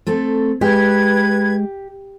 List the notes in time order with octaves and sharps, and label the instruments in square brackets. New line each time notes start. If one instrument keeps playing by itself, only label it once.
[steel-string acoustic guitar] A3 C4 A4
[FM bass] G#3 [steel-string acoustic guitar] G4 [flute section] B4 G#6